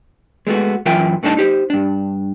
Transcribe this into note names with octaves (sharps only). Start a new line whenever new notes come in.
G#3 A3 B3 F#4
F#2 E3 F4 A#4 E5 G5
G2 A3 D4 D#4 A5
D#4 G4 C5
G2 D4